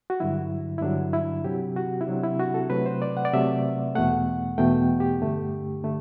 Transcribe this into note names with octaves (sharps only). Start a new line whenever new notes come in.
F#4
G2 D3 F#3 E4
E4
G2 D3 F#3 D4
E4
C3 F#3 C4 G4
F#4
E4
C3 F#3 C4 D4
E4
F#4
A4
C3 F#3 A3 B4
C5
D5
F#5
D5
C3 F#3 A3 E5
E2 B2 A3 F#5
E2 B2 A3 G5
G4
G2 D3 A3
D3 A3